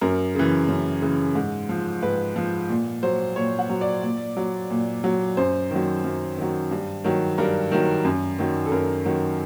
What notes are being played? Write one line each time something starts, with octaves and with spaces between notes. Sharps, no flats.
F#2 A#4
C#3 E3
F#2
C#3 E3
G#2
F3
G#2 B4
F3
A#2
F#3 C5
A#2 C#5
F#5
F#3
D5
A#2
F#3
A#2
F#3
F#2 C5
D#3 F#3
F#2
D#3 F#3
G2
D#3 F#3
G2 A#4
D#3 F#3
F#2
D#3 F#3
A4
F#2 A#4
D#3 F#3